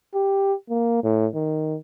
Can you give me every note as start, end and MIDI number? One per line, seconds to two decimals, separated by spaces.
0.15 0.53 67
0.70 0.99 58
1.03 1.27 45
1.35 1.77 51